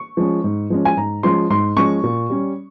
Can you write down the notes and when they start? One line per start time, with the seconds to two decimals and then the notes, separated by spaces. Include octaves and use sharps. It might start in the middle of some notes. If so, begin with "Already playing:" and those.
Already playing: C#6
0.17 F3 G#3 C#4
0.44 G#2
0.70 F3 G#3 C#4
0.85 G#5
0.97 G#2 A#5
1.23 F3 G#3 C#4 C6
1.50 G#2 C6
1.76 F3 G#3 C#4 C#6
2.03 A#2
2.30 G3 C#4